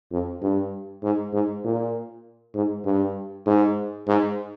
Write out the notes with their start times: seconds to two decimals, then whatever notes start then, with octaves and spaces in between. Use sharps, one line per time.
0.12 F2
0.42 G2
1.03 G#2
1.33 G#2
1.65 A#2
2.55 G#2
2.85 G2
3.46 G#2
4.07 G#2